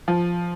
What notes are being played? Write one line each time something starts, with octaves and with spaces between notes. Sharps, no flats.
F3